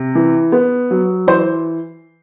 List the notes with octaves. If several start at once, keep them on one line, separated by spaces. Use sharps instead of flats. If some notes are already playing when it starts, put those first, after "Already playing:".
Already playing: C3
E3
B3
F#3
E3 C5